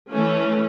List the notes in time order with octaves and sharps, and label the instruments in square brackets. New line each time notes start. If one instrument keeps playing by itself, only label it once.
[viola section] E3 A3 C#4